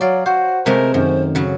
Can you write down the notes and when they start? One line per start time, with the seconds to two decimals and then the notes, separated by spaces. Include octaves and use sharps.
0.01 F#3 D5 F5
0.26 F#4 C5
0.66 C3 G#3 A3 A#4 C5
0.94 F#2 D#3
1.35 C#3 F#3